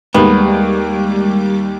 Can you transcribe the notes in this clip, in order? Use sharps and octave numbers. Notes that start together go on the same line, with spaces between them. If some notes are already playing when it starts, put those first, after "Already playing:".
D#2 G3 G#3 B3 D6